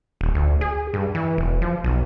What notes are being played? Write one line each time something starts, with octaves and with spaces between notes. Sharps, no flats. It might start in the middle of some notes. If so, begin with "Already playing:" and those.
D#1
D2
G#4
G2
E3
E1
F3
B1